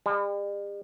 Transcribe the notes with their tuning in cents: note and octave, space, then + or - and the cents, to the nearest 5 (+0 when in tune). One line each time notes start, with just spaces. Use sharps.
G3 +45